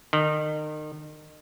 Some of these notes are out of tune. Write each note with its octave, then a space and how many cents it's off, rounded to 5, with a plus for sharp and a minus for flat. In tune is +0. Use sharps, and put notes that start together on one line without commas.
D#3 -30